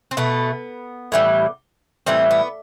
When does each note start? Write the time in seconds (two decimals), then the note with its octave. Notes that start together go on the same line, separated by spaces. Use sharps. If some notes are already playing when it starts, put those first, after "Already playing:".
0.11 C4
0.17 B2 A3 B3
1.12 A2 E3 G3
2.06 A2 E3 G3 C4
2.31 B3